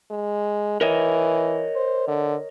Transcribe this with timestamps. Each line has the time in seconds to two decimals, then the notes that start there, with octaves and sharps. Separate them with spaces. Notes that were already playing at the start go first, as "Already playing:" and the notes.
0.11 G#3
0.81 E3 A#4 C#5 D#5
1.76 C5
2.08 D3